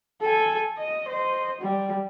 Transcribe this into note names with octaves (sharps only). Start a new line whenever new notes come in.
A4 G#5
D#5
C5 D#5
G3